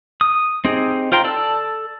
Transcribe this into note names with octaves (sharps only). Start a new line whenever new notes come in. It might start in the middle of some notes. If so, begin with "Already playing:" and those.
D#6
C4 D#4 G4 G#4
F4 C5 G5 A#5 C6
A4 D5 A5 E6